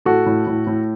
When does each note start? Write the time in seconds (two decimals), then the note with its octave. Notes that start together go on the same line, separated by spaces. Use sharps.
0.05 A2 F#4 A4
0.26 A2
0.47 A2
0.67 A2